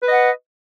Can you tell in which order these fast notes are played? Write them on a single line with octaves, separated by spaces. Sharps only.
B4 D#5 F#5